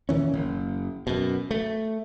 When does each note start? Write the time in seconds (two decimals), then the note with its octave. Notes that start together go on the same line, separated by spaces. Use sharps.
0.09 A#2 D#3 E3 C#4
0.34 F#1
1.07 F#2 B2
1.51 A3